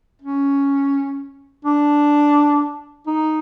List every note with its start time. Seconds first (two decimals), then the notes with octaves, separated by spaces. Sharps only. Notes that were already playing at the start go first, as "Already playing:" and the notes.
0.22 C#4
1.65 D4
3.07 D#4